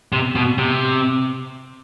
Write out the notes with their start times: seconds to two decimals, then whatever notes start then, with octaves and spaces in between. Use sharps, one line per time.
0.12 C3
0.35 B2
0.58 C3